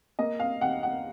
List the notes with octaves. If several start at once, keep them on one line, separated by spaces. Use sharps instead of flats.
A#3 D#5
F5
D#2 F#5
F#5